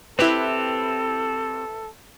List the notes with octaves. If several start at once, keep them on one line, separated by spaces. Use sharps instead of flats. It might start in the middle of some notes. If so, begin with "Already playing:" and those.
C4 E4 G4 A4 B4